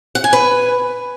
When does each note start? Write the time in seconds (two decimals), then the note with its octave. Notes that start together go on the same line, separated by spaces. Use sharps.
0.15 F#5
0.24 G#5
0.33 B4